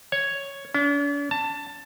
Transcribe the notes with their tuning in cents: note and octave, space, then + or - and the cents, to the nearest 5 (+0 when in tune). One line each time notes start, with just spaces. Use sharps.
C#5 +0
D4 -45
A5 +15